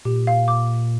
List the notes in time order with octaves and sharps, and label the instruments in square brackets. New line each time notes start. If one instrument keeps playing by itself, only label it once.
[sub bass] A#2 [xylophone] G4
[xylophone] F5
D6